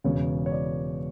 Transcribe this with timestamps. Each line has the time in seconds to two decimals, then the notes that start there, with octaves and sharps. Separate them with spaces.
0.04 E1 E2 C#3 C#5
0.46 C#5
0.52 D5